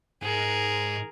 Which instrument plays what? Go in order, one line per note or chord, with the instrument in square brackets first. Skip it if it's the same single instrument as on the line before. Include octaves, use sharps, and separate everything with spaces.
[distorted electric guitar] G#2 [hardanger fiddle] G#4 A#4